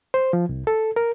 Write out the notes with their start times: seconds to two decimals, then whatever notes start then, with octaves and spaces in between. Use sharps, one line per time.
0.14 C5
0.33 F3
0.49 C2
0.67 A4
0.96 A#4